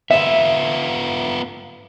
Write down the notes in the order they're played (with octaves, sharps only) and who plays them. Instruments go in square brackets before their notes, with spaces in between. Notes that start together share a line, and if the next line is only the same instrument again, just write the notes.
[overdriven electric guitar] B3 F4 [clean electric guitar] E5